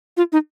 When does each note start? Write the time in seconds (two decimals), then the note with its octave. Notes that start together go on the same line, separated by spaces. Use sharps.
0.17 F4
0.32 D#4